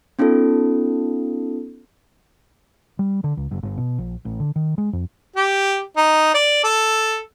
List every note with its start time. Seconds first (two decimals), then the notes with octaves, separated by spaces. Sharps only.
0.19 B3 C#4 D#4 F4 A4
2.99 G3
3.24 D3
3.37 C#2
3.51 F#1
3.63 G1
3.78 B2
3.98 A#1
4.25 A1
4.40 D3
4.56 D#3
4.78 G#3
4.93 F2
5.36 G4
5.97 D#4
6.34 D5
6.64 A4